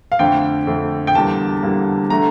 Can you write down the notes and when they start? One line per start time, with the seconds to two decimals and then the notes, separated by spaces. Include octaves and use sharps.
0.12 F5
0.19 F2 D3 A3 G5
0.67 F2 D3 A3
1.07 G5
1.15 E2 D3 G3 A#3 A5
1.63 E2 D3 G3 A#3
2.10 D3 A3 A#5